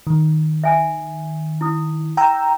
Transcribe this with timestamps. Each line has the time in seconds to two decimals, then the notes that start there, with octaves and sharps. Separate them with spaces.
0.07 D#3
0.64 E5 G#5
1.61 E4 D#6
2.17 G5 A#5 E6